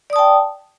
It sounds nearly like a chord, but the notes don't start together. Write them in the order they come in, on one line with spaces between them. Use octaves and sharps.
D5 D#6 A5 G5